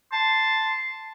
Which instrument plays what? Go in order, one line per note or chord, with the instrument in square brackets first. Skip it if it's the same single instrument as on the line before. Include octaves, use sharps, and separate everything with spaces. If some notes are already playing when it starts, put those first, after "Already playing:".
[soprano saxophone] A5 [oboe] C6